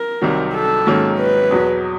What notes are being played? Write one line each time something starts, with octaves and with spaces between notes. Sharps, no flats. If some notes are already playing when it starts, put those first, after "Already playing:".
Already playing: A#4
C2 C3 D#3 F#3
A4
G#2 D#3 F#3 A#3 C#4
B4
E2 B2 F#3